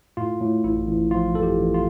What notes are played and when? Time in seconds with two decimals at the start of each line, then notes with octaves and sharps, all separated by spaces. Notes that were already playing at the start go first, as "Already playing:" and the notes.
0.17 A2 F4
0.41 A2
0.64 A1 E4
0.87 A1
1.11 F3 F4
1.35 A1 A4
1.43 G4
1.58 A1
1.74 F4